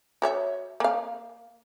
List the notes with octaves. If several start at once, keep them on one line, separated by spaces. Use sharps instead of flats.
F#4 C#5 E5
A#3 F5